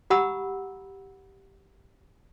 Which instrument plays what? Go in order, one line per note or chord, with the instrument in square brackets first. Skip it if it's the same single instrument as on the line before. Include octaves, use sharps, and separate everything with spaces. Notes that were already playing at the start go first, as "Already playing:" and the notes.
[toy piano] G4 F#5 A#5 B5 D#6 E6